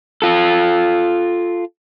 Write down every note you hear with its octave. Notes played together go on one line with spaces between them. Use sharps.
F4 A4